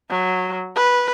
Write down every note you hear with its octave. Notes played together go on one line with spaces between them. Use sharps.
F#3
B4